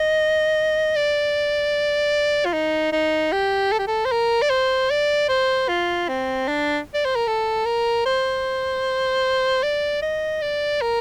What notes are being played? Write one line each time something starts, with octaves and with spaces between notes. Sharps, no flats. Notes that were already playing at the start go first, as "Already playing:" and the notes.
Already playing: D#5
D5
F4
D#4
D#4
G4
A4
G4
A4
C5
A#4
D5
C5
D5
C5
F4
C4
D4
D5
C5
A#4
A4
A#4
C5
D5
D#5
D5
A#4